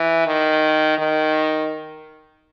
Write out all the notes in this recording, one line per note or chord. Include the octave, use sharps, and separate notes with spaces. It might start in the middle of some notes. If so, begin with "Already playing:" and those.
Already playing: E3
D#3
D#3